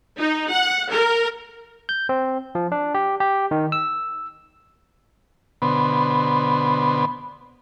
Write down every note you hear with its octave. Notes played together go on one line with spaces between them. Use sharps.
D#4
F#5
A#4
G6
C4
F3
D4
G4
G4
D#3
E6
B2 D3 B3 C5